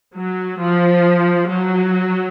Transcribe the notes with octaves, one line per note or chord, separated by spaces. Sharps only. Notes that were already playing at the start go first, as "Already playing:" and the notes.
F#3
F3
F#3